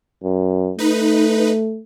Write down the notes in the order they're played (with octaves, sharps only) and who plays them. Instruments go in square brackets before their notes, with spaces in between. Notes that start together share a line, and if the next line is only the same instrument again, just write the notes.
[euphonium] F#2
[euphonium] A3 [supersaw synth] D#4 B4